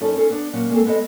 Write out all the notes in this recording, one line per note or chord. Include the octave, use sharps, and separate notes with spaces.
F#2 C#4 D#4 A4
C#4 D#4 A4 C5
B3 D4
A#2 F#3 C#4
G#3 A#3 C4 A4
G#3 B3 A4 C5 D#5